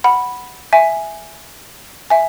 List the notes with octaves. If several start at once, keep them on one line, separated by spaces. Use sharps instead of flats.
F#5 B5
E5 G#5
E5 G#5